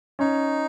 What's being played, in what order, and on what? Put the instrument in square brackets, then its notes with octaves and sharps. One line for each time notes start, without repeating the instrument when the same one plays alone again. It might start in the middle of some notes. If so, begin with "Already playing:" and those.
[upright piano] C#4 [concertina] D#4